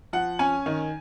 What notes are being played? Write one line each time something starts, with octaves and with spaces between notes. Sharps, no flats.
F3 F#5
C#4 G#5
D#3